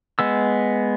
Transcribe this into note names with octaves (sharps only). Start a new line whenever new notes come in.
G#3 B3 E6